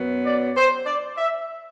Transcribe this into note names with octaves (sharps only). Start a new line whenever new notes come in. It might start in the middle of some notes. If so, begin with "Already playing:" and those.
Already playing: F#2 F#3 B3
D5
C5
D5
E5